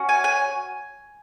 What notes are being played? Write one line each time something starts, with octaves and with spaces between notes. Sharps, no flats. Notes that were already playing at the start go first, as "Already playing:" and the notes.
Already playing: C#4 F#4
G#5
G#5